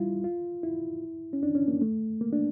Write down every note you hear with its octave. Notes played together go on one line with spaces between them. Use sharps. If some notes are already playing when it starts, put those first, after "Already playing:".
Already playing: G3 E4 F4
F4
E4
C#4
D4
C#4
A#3
A3
A#3
D4